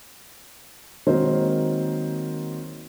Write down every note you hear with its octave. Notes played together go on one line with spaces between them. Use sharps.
D#3 F#3 G#3 A#3 C4 C5